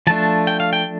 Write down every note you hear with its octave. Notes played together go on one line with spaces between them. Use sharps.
F3 A3 D4 A5
G5
F5
G5